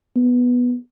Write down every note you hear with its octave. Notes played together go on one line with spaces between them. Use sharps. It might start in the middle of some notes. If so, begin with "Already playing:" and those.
B3